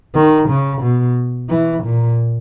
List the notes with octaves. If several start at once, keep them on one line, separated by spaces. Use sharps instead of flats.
D#3
C#3
B2
E3
A#2